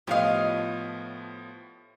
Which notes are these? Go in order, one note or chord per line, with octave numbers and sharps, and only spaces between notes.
A2 F3 B3 F4 G4 C#5 D#5 F5